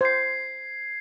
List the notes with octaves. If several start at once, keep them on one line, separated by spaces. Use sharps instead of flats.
C5 G#6 C7